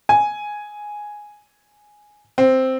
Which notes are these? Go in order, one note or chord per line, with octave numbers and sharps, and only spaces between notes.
G#5
C4